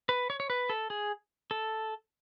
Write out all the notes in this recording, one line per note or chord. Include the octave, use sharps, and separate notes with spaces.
B4
C#5
C#5
B4
A4
G#4
A4